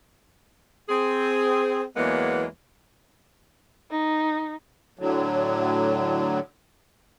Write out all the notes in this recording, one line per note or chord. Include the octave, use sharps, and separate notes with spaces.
C4 G#4
E2 E3 F#3 G#3 A#3 B3
D#4
A2 D3 F#3